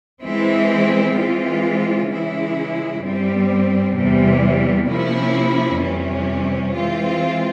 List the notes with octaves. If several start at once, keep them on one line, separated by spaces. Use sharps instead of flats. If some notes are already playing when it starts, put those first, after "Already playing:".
E3 G#3 C4 E4
E3 G#3 C4 F4
C#3 E3 G#3 E4
G2 G3 C4
E2 C3 E3 G3
C3 F3 A#3 C#4 E4
F2 C3 E3 G3 C#4
E3 G#3 C4 F4